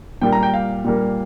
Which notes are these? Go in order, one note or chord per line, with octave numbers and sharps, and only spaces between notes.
A#2 G3 A#3 G5
A#5
G5
F5
A#2 G3 A#3